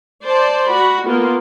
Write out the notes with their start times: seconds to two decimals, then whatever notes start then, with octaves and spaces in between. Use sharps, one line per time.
0.24 C5 D5 A5
0.69 F#4 B5
1.05 A#3 B3 F4